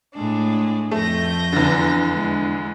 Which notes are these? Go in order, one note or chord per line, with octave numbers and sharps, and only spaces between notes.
A2 G#3 D4
F2 A3 G6 A#6
E2 D3
G#3